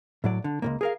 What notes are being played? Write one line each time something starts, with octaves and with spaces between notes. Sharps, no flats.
A2 F#3 D5
D3
C#2 G#2 A#3
G#4 A#4 F5